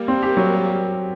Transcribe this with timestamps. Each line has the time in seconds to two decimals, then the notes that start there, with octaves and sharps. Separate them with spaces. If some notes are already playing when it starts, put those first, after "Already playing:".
Already playing: G3 A#3
0.08 C4
0.23 G4
0.37 F#3